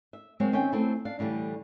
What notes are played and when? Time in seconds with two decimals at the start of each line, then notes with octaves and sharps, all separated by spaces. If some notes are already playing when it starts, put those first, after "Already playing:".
0.13 E5
0.40 F#3 G#3 A#3 C4 C#5
0.52 D#2 C4 C#4 E5 G5
0.72 A3 C4 E4 A4
1.05 D4 F5
1.19 A2 D3 E3 G3